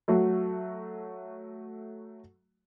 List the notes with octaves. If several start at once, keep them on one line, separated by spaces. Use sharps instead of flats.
F#3 A3 F#4